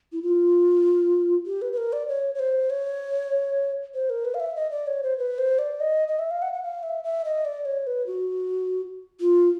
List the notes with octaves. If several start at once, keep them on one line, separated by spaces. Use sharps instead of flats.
E4
F4
G4
B4
B4
A#4
D5
C#5
C#5
C5
C#5
C5
A#4
B4
F5
E5
D#5
D5
C#5
C5
B4
C5
D5
D#5
D#5
E5
F5
F#5
F#5
F5
E5
E5
D#5
D5
C#5
B4
F#4
F4